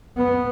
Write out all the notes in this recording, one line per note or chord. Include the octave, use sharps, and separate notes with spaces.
B3